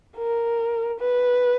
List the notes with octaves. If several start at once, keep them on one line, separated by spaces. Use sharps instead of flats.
A#4
B4